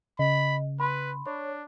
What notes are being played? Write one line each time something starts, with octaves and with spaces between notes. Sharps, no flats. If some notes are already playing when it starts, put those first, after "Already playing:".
C#3 D#5 B5
B4 B5 C6
D4 C#5